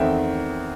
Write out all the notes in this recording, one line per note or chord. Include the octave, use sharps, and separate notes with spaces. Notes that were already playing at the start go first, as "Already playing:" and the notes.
Already playing: E2 D#3 A3 C4 E5 G5